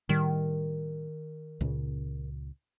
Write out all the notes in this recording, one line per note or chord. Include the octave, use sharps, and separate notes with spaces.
A2 D#3 G3
C#2 A#2 C#3